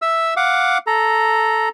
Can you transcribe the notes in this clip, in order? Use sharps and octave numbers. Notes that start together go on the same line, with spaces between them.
E5 E6
F5 F#5 D6
A4 A#5